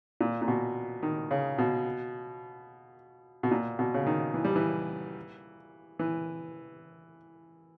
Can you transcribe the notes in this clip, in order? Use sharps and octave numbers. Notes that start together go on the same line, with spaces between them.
A#2
A#2
B2
D#3
C#3
B2
B2
A#2
B2
C#3
D#3
E3
G3
E3
E3